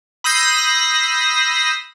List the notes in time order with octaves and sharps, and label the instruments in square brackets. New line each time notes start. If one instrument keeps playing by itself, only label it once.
[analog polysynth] B5 D#6 E6 G6 A#6 C7